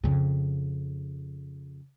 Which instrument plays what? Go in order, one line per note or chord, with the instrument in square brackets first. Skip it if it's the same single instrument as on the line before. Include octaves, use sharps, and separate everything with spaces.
[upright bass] F2 C#3